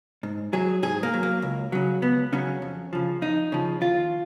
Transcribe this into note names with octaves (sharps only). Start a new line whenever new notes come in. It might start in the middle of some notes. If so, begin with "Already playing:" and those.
G#2
F#3 G#4
G#2 G#4
A#3
F#3
A#3
C#2
C#3 F#3
C#2 B3
C#3 F#3 C#4
F2
C#3 F3
F2 D#4
C#3 F3
D#2 F4